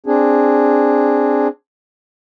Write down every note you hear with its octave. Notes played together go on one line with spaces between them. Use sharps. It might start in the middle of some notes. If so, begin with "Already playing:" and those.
C4 D4 G#4